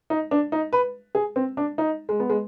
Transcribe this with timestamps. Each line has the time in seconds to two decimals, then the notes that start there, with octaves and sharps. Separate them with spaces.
0.10 D#4
0.31 D4
0.52 D#4
0.73 B4
1.15 G#4
1.36 C4
1.57 D4
1.78 D#4
2.09 G#3
2.20 B3
2.30 G#3